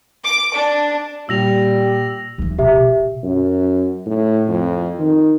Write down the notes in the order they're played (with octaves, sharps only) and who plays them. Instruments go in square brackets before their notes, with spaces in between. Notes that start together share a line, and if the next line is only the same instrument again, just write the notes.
[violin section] D6
D4
[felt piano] A#2 [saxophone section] G3 [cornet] G4 [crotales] E6 A#6 F7
[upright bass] D#2 E3
[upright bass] B2 [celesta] G4 E5
[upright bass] B2
[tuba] F#2
A2
F2
D#3